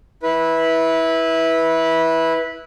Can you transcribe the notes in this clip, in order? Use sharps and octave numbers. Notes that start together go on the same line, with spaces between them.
E4 B4